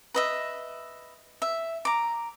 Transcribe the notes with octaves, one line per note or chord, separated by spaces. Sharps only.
B4 D#5 E5
E5
A#5 D6